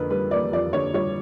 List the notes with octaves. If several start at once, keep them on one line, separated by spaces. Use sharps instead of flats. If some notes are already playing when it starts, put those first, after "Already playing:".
Already playing: F2 D3 A#3 A#4 B4
G3 B4
A#3 D5
F2 D5
D3 C#5
G3 C#5